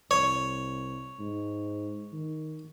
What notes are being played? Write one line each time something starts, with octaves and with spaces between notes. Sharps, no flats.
C2 C#5
G#2
D#3